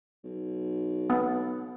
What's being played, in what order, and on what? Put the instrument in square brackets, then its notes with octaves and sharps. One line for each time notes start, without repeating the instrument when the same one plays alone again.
[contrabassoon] B1
[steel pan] B3